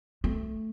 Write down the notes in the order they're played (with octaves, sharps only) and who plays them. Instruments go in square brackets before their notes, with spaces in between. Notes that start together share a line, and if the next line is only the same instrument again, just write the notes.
[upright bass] A3